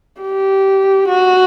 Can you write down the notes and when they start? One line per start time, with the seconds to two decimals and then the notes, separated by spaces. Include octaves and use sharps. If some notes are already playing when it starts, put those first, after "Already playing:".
0.22 G4
1.08 F#4